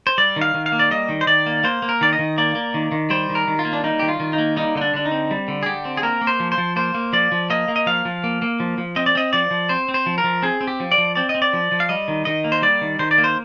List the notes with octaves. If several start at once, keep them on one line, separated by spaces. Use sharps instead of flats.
C5
G3 D5
D#3
F5
D#3
F5
A#3
D5
G3 D#5
D#3
C5
D#3 D5
A#3
A#3 C5
A#3
A#4
D#3 D5
D#5
D#3
A#3 D5
A#3
D#3
D#3
G3 C5
D#3
A#4
D#3
F4
A#3
D4
G3 D#4
D#3 G4
F4
D#3
D#4
A#3
G3 D#4
D3 D#4
D4
D3 D4
D#4
C4
G3
D3
G#4
D3 G4
C4
G#4
A#3 A#4
A#3
C5
F3
C5
F3
A#3 C5
A#3
F3 D5
F3
A#3 D#5
A#3
D#5
F3 F5
F3
A#3
A#3
F3
F3
C4 D#5
D5
C4 D#5
F3 D5
F3
C4 C5
C4
C5
F3
A#4
F3
C4 G#4
C4
G4
F3
D5
F3
C4 D5
D#5
C4
D5
F3
F3
F5
G3 D#5
D#3
D#3 D#5
A#3
C5
G3 D5
D#3
D#3 C5
D5
A#3
C5